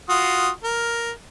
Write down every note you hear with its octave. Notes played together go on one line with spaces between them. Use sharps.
F4 F#4 D#6
A#4